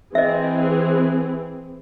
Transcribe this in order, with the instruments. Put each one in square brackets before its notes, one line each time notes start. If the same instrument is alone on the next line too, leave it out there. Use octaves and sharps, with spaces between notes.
[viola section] E3 C4 G#4 [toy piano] D#5 E5